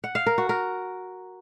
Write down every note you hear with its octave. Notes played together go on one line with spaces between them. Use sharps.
F#5
F5
A#4
F#4
A#4